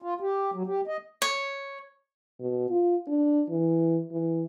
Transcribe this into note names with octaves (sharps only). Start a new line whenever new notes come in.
F4
G4
F#3
G4
D#5
C#5
B2
F4
D4
E3
E3